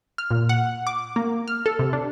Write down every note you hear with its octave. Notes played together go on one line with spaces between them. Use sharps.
F6
A#2
F#5
D6
A#3
F6
A4
C3
D4